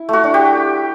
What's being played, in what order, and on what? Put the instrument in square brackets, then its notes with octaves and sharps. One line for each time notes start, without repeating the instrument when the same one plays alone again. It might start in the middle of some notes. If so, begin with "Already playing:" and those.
Already playing: [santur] E4
A3 F#4
D4
G4